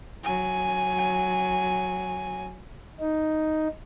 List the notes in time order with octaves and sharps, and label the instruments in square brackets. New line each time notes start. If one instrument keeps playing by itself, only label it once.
[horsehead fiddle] F#3 G#5
[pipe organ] D#4